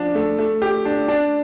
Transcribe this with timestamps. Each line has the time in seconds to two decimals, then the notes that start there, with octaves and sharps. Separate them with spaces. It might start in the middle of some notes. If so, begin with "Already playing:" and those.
Already playing: F3 D4
0.15 A3
0.39 A3
0.62 G4
0.85 D4
1.08 D4